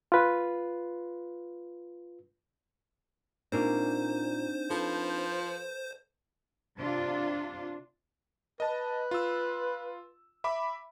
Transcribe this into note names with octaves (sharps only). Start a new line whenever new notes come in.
F4 B4
A#2 C4 D4 D#4 A#4 C5 D5
F3 A4 B4
C3 D4 F4
B4 D#5 A5
F4 E6
E5 B5 D6